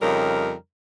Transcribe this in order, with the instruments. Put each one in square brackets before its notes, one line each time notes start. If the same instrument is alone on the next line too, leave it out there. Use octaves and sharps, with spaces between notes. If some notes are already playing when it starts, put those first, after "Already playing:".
[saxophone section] F2 C#3 G3 D#4 A#4